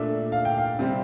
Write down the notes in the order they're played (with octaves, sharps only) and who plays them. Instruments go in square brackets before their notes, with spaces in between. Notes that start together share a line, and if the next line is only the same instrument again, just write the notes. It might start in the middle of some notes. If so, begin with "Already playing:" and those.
Already playing: [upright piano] A#2 A3 D4 E5
F5
G5
F5
C3 G3 C4